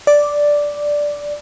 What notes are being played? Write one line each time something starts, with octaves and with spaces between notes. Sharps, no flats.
D5